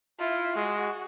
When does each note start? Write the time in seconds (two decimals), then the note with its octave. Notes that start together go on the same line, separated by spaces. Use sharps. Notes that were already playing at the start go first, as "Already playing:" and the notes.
0.20 E4 F4
0.56 G#3 F#4